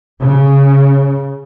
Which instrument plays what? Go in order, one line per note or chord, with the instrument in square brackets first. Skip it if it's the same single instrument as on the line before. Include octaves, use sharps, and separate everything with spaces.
[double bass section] C#3